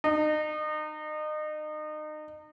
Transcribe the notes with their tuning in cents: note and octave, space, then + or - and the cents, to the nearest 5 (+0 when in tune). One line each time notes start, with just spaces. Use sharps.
D#4 -30